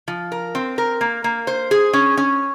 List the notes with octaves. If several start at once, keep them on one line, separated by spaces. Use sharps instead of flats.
F3
A#4
C4
A#4
A#3
A#3
C5
G#4
C#4
C#4